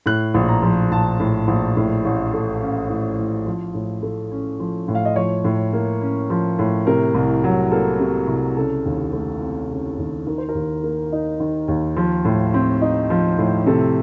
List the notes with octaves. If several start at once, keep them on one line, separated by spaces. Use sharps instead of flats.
A2 F#6
A#1
A#5
F3
A#1 A5
A2
A#1
A2
A1
A3
C#4 F5
A2
A1
F3
A2
A3
C#4
F3
A2
F5
D#5
F3 C#5
A2
A#3
C#4
F3
A2
C3 A#4
C2
F#3
A#3 A4
C3
C2
C#3 A4
D#2
A3
C4
C#3
D#2
D#3 A#4
C5
A#4
D#2
A#3
D#4
D#3
D#2
F3
A2
C4
D#4
F3
A2
C3 A4